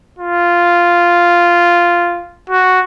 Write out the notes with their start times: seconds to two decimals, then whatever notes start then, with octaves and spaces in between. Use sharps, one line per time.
0.19 F4
2.49 F#4